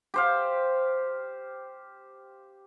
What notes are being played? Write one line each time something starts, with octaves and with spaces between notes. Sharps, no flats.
G4 C5 F5